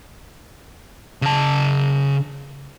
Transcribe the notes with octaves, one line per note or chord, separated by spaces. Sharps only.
C#3 A5